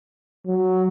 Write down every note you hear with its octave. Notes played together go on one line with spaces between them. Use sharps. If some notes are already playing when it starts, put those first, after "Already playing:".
F#3